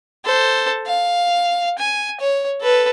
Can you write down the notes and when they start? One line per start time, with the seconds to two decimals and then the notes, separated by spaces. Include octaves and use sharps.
0.25 A4 C5
0.86 F5
1.79 G#5
2.20 C#5
2.61 A4 B4